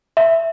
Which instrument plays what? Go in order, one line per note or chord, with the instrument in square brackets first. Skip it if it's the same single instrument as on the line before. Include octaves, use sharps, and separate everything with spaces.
[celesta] E5